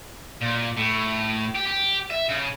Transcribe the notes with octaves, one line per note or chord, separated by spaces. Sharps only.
A#2
A2
G4
G4
E5
C#3